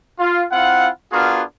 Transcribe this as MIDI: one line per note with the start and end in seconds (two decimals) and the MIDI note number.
0.19 0.44 65
0.52 0.89 60
0.52 0.89 64
0.52 0.89 65
0.52 0.89 77
0.52 0.89 78
1.12 1.42 59
1.12 1.42 62
1.12 1.42 65
1.12 1.42 66
1.12 1.42 68
1.12 1.42 70